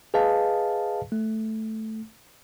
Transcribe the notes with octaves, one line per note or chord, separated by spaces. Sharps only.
G#4 B4 D#5 F5 A5
A3